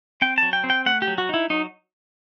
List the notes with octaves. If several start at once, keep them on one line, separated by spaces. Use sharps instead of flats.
C4 G5
F#3 A5
G5
C4
G5
A3 F#5
G4
F#3
F#4
D#4 E4
F#3 D#4